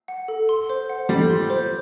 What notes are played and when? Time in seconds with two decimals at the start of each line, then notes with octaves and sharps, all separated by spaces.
0.08 F#5
0.28 A4
0.49 C6
0.70 C5
0.90 F#5
1.09 G3 A4
1.30 C6
1.50 C5